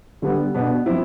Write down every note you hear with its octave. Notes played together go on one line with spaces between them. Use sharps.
D3 G3 B3
B2 B3 D4
F3 C4 E4